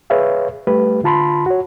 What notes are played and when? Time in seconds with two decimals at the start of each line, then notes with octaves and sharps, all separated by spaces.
0.10 G#4 B4 C#5 E5 F5
0.67 G3 A3 G4 B4
1.03 D3 F4 A5 B5 C6
1.46 F#4 C#5